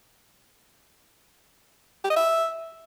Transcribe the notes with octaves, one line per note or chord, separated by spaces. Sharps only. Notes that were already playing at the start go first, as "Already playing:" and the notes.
G4
D#5
E5